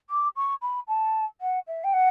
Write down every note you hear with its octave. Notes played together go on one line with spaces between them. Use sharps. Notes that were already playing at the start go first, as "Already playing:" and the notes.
D6
C#6
B5
A5
F#5
E5
G5
F#5